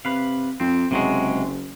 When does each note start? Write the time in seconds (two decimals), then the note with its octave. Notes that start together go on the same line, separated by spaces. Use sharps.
0.05 C3 B4 F5
0.60 F2 C4
0.91 F#1 C3 F#3 G#3